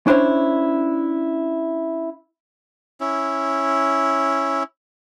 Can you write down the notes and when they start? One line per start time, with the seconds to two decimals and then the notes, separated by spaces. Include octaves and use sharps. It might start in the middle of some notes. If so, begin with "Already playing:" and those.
0.07 C#4 D4 E4 C5 C#5
3.00 C#4 E4